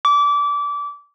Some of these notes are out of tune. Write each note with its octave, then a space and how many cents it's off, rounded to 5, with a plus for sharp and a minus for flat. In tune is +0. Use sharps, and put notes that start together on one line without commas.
D6 -25